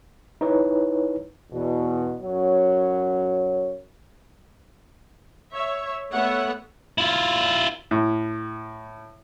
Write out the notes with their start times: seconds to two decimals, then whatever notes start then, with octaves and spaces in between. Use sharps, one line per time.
0.41 D#4 E4 B4 C#5
1.52 E2 B2
2.22 F#2 F#3 C#5
5.52 C#5 E5
6.12 A3 B3 C#5 E5 F#5
6.98 E4 F4
7.91 A2